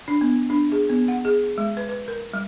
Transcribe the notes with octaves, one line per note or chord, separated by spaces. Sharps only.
D4
B3
D4
G#4
B3
F#5
G#4
G#3
B4
B4
A#4
G3